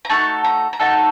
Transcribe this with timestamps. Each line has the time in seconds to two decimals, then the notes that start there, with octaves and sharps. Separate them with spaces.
0.05 A#5
0.09 A3 D#4 F#4 A4 A5
0.45 A#5
0.73 A#5
0.79 A3 D#4 F#4 A4 A5